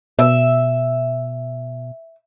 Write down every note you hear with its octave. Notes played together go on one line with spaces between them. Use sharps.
B2 E5